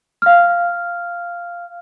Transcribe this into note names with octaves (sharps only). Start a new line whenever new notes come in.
F5 F6